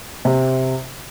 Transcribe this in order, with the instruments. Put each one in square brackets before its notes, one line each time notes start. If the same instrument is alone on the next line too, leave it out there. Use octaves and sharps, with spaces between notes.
[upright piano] C3